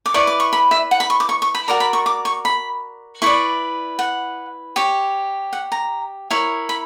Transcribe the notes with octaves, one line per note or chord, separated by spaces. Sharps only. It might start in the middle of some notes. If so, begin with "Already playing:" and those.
D6
E4 B4 D5 C#6
D6
C#6
B5
E5
F#5
B5
C#6
D6
C#6
C#6
B5
F#4 A#4 D5 A#5
B5
C#6
D6
C#6
B5
E4 B4 D5 C#6
F#5
G4 C#5
F#5
A#5
E4 A#4 C#5
B5